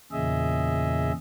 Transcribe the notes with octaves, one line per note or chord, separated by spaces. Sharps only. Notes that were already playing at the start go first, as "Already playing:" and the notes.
E2 A#2 C#3 G#4 D#5 E5